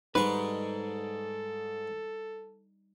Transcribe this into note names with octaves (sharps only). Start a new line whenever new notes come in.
G#2 G3 G#3 D#4 A4 B4 C#6